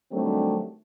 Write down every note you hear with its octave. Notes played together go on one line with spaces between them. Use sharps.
D#3 F#3 G3 A3 C4 D4